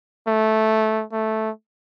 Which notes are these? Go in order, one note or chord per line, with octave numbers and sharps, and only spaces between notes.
A3
A3